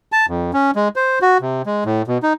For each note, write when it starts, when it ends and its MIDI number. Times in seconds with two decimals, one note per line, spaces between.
0.12 0.26 81
0.28 0.51 41
0.53 0.71 61
0.76 0.88 56
0.96 1.19 72
1.22 1.38 66
1.41 1.62 48
1.66 1.84 56
1.85 2.02 45
2.08 2.18 47
2.23 2.33 63